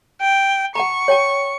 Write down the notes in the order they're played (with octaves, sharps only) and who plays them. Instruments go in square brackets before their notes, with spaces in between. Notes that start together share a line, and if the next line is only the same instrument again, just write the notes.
[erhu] G5
[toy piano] F#5 A5 A#5 [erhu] C#6
[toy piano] C#5 G5 A5